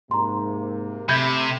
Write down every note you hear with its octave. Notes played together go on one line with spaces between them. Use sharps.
G#2 C3 A#3 A#5 C6
C3 A3 E5 B5 G6 G#6